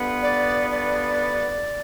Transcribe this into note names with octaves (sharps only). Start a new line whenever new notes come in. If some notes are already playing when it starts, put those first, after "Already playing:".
Already playing: G2 D3 B3
D5
D5